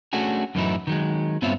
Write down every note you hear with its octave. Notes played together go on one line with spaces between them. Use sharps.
A3 C#4 D4 F#4 G#4
F#2 A2 E3 F#3 D#4 E4
D#3 F#3 G#3
G2 B3 C4 F4 C#5 E5